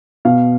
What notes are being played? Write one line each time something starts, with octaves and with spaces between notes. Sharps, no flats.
B2 F5